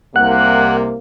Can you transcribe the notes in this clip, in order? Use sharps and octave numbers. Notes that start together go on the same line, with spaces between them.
C2 C3 A#3 F#5